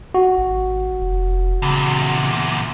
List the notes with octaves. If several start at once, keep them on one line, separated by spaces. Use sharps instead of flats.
F#4
G#1
F1
E2 A#2 C#3